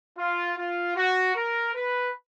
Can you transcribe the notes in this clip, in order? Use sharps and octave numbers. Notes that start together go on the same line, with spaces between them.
F4
F4
F#4
A#4
B4